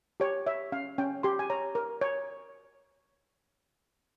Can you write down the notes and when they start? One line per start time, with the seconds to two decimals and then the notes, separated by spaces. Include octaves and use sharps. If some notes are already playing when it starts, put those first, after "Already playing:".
0.20 G4 C#5
0.46 C#5 E5
0.72 C#4 F5
0.98 C#4 G5
1.23 G4 C6
1.39 G#5
1.50 C#5 A#5
1.75 A#4
2.01 C#5